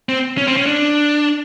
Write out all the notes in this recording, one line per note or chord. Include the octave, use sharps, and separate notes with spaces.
C4
C#4
C4
C#4
D4